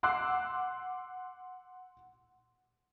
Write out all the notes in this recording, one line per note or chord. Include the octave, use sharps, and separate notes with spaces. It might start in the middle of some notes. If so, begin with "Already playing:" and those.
F#5 C6 D6 E6 F#6 C7